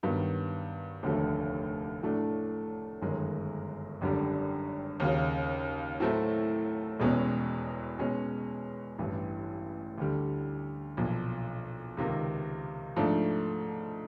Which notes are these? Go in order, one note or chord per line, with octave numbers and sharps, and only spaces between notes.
G2 D#3 F#3 B3
F1 D#2 D3 F#3 A3
A2 F#3 A3 D4
G1 F#2 D#3 G#3
G#1 F#2 D3 G3
D#2 C#3 F#3
A2 F#3 A3 C4 E4
E1 E2 B2 G#3 C#4
B2 G#3 C#4
A1 G2 E3
D2 D3 G3
B1 A#2 F3
C#2 C3 D#3
G#2 F3 A3 D4